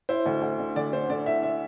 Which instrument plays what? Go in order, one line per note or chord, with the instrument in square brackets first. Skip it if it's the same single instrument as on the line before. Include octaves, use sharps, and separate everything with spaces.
[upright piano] E4 [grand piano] C5
[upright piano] D2
D2
D3
[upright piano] D2 [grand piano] D5
[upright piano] D3 [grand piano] C5
[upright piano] D3 [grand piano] D5
[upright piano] E4 [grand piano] E5
[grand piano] E5